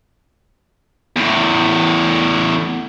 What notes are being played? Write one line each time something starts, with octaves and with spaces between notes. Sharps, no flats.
E2 A2